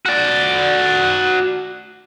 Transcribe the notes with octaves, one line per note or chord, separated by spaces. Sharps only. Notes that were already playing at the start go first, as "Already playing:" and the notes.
F#4 D5